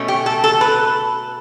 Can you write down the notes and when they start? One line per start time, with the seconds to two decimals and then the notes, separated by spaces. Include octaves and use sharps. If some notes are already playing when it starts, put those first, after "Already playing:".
Already playing: B2 A3 C#4
0.08 G4
0.26 A4
0.44 A4
0.61 B4